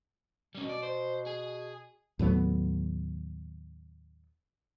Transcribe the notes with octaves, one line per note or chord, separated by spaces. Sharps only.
B2 G3 C#4
D5
C5
G#4
D#2 A2 F#3 B3